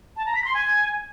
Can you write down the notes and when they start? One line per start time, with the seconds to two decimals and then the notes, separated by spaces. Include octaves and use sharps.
0.17 A5
0.26 A#5
0.35 B6
0.45 C6
0.54 G#5